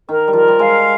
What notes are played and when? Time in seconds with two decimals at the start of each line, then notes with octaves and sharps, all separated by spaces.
0.09 D#3 A#4
0.28 G3
0.33 F3 A#4
0.48 G3
0.59 G#3 F5